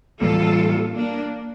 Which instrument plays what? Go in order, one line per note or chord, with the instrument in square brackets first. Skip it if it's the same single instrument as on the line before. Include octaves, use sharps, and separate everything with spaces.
[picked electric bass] A2 E3 G3 A#3 [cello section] F4 A4
[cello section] A#3 D4